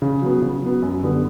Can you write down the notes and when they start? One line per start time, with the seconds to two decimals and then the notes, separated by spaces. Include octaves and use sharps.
0.02 C#3
0.22 F#3 B3
0.42 C#3
0.62 F#3 B3
0.82 F#2
1.03 D3 G3 B3